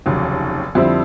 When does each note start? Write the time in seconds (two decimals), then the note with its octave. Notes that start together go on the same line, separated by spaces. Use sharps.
0.06 F1 D#2 C#3 F#3
0.75 F2 D3 G3 C4 E4